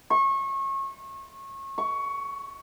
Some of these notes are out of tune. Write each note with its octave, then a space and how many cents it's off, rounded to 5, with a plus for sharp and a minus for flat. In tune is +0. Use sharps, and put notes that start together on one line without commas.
C#6 -30
C#6 +15